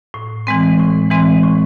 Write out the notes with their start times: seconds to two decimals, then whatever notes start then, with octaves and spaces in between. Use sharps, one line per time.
0.14 A2
0.47 E3 G#3 C4
0.79 A2
1.11 E3 G#3 C4
1.43 A2